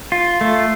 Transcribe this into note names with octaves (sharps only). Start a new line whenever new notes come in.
F4
A3